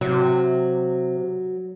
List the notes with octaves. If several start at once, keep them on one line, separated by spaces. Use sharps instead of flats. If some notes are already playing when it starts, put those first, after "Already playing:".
C3 F#3